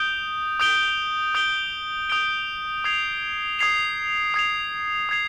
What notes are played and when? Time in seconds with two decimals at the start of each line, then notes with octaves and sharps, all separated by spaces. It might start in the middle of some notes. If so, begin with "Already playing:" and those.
Already playing: D#6 G6 D7 G7
0.60 D#6 G6 D7 G7
1.35 D#6 G6 D7 G7
2.09 D#6 G6 D7 G7
2.84 D#6 G#6 C7 F7
3.59 D#6 G#6 C7 F7
4.34 D#6 G#6 C7 F7
5.09 D#6 G#6 C7 F7